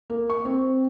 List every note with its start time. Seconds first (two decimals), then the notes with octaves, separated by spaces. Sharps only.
0.10 A#3
0.30 C#6
0.45 C4